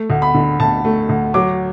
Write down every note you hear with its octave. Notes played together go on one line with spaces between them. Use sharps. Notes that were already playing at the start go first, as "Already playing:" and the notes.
Already playing: A3
D2
B5
D3
D2 A5
A3
D2
F#3 D6